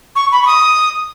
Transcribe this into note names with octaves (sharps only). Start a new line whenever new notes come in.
C#6
B5
C#6
D#6